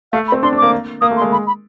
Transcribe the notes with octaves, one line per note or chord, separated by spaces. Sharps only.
A3 F5
B5
C4
D4 C6
D4
A#3 D6
A#3 D#6
A3
C6
G#3
B5
B5